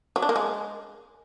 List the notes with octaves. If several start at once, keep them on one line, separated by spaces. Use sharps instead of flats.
F#3
D4
A#3
G#3